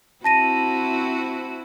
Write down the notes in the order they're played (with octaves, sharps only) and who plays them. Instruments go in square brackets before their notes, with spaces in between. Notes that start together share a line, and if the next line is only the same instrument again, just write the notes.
[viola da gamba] C4 E4 F#4 [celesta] A5 A#6 D#7